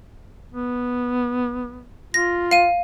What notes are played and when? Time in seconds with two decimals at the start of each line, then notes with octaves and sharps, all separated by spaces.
0.52 B3
2.14 F4 A#6
2.51 F5 D#7